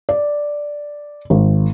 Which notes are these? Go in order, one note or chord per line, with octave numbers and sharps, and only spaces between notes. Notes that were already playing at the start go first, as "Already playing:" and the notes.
D5
G#1